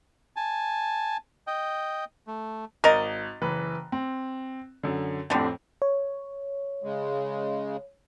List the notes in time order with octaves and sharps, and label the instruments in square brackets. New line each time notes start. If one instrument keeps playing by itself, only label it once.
[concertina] G#5 A5
D#5 G5
A3
[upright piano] G#1 A6 [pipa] A#4 D#5
[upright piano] F#1 E3 B4
C4
F#2 D3
[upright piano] F2 A2 C4 [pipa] D3 G3
[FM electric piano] C#5
[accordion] C#3 G#3